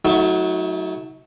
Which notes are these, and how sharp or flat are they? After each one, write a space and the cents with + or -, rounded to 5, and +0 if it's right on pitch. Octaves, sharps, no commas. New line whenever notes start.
F#3 +0 A3 +0 D#4 +45